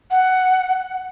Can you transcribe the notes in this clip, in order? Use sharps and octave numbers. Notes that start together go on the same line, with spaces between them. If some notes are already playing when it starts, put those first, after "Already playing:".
F#5